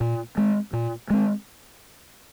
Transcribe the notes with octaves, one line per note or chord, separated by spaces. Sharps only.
A#2
G#3 C4
A#2
G#3 C4